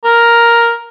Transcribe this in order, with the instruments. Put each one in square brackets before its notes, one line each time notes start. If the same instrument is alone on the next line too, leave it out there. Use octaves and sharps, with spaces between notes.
[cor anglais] A#4